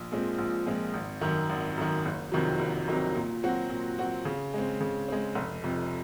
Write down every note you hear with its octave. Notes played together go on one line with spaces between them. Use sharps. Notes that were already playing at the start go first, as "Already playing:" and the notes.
Already playing: A#1
A#2 F3 G#3 C4
A#1
A#2 F3 G#3 C4
G#1
F#2 D#3
G#1
F#2 D#3
F#1
F2 C3 D#3 F#3
F#1
F2 C3 D#3 F#3
A#2
F#3 C4 F#4
A#2
F#3 C4 F#4
C#3
G#3 C4
C#3
G#3 C4
F1
F2 C3